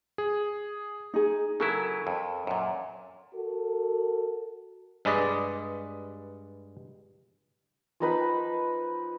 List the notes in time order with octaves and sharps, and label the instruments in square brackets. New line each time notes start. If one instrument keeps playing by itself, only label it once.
[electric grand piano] G#4
[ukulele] D#4 G#4
[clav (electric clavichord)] C#3 F#3 E4 [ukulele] A4 A#4
[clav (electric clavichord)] F2
F#2 A#2
[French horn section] F#4 A4 A#4
[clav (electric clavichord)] G2 G#3 B4 D5 D#5
[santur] F3 D#4 B4